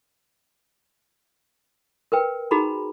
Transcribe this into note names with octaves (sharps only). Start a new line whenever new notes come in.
A#4 B4 G5
D#4 F#4 G#4 A#5 B5